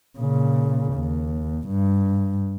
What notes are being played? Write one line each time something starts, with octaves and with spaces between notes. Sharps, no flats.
A#2 C#3
D#2
G2